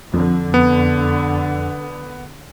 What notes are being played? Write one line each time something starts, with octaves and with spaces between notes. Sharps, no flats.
F2 D3
B3